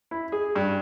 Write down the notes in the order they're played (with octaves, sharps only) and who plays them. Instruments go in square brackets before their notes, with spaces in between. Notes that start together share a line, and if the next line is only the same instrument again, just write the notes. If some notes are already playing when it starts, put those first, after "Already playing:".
[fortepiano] E4
G#4
G2